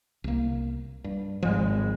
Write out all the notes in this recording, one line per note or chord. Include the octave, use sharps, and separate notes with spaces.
C2 A#3
G2
G#1 G#2 F3 G#3